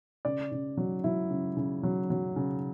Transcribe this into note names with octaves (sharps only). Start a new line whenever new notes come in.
C#3 D5
C#3
F#3
F#3 E4
C#3
C#3
F#3
F#3
C#3